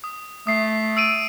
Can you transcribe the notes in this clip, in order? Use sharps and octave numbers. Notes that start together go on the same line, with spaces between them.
D#6
A3 D#6 C7
E6 D7 D#7